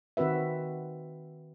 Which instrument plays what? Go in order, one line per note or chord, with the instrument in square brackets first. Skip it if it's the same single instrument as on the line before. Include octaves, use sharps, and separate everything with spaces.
[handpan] D#3 C4 F#4 B4 E5